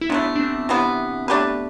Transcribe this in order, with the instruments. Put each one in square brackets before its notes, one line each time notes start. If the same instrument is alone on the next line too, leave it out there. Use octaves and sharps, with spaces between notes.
[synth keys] E4
[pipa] C3 E3 A3 [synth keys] B3 D4
[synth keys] D4
C4
[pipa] C3 E3 B3
A3 D4 G4 B4